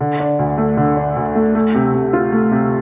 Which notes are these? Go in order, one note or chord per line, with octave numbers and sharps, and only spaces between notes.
D3
D4
D2
A3
D3
D4
D2
A3
A3
C3
C3
F4
A3
C3